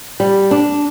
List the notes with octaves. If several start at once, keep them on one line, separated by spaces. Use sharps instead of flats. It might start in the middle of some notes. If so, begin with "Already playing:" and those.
G3
D4